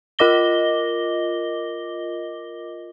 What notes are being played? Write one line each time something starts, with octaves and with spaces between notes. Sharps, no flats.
F4 A#4 D#5 D6 A#6 G7